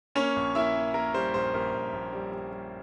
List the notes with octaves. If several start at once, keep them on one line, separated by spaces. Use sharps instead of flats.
A#3 C#4 C#5
A#1
A#3 E4 E5
A#3
A#3 A#4
G3 C5
A#1 C5
A#1 A#4
A#1
A#1
G3
G3
G3